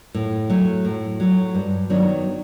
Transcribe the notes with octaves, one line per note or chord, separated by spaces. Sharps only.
A2
F#3 A3
A2
F#3 A3
G2
D#3 F#3 B3 D4